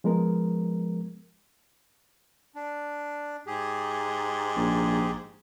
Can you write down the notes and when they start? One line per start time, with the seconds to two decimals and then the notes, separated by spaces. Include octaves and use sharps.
0.04 F3 G#3 B3 A#4
2.55 D4
3.47 G#2 G4 G#4
4.56 A#1